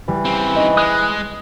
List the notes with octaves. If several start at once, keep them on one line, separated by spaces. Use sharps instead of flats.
E3 G3
C#3 C4 G4
D#4 C#5 D#5
G#3 D#6 F#6